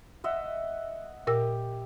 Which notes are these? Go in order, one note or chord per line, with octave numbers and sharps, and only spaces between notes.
D#5 E5 F#5
A#2 G4 A#4 E6